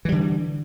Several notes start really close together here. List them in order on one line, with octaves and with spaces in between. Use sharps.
E3 G3 D3